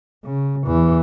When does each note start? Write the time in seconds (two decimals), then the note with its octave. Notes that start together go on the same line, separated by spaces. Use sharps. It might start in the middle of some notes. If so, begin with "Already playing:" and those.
0.25 C#3
0.67 E2 E3